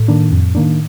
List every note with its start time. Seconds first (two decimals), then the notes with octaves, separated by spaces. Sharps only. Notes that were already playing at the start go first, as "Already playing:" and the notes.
Already playing: A2
0.08 D#3 A#3 D4
0.31 F2
0.55 D#3 A#3 D4